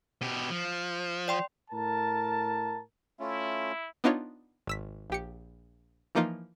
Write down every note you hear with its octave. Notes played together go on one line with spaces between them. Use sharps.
B2 G4
F3
D5 G5 C6
A2 A#4 A5
A3 C#4 E4 F4
B3 D4 D#4 F4 C#5
G#1 E6 B6
A#1 G4 C#7
E3 F3 A#3 D#4 F4